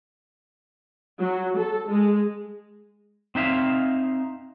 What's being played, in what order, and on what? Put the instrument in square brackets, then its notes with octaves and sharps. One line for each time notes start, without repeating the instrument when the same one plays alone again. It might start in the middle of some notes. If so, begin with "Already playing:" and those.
[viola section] F#3
A4
G#3
[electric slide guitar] C4 D#4 E5 F5